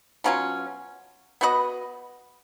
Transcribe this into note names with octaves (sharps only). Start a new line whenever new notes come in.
B2 F#3 C#4 F4
B3 F#4 B4 D#5